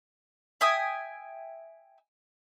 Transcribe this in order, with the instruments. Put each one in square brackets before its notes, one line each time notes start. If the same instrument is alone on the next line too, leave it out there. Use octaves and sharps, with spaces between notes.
[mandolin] E5 G5 G#5 D#6